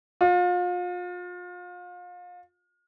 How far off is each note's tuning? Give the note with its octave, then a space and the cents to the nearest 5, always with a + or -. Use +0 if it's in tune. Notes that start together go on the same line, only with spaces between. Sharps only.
F4 +35